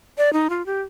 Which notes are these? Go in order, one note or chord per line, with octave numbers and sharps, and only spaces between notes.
D5
D#4
F4
G4